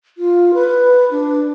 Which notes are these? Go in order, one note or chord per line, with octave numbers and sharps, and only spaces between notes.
F4
B4
D4